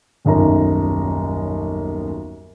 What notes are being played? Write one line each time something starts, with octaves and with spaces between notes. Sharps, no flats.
D#1 B1 F#2 A#5